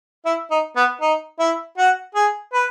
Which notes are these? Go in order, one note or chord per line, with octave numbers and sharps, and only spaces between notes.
E4
D#4
B3
D#4
E4
F#4
G#4
B4